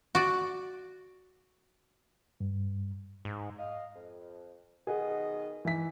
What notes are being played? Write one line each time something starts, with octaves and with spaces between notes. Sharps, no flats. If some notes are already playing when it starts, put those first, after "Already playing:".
F#4 D5
G2
G#2
D#5 F5
F2
B2 D#3 G#4 D#5 F#5
E3 E5 B6